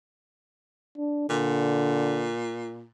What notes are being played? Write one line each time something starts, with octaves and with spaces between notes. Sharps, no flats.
D4
A#2 D3